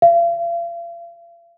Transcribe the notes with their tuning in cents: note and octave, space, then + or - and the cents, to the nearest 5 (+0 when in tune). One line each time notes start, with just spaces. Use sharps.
F5 -40